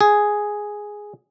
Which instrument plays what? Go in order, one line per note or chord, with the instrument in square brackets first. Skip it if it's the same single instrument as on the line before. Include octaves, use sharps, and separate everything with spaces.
[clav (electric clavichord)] G#4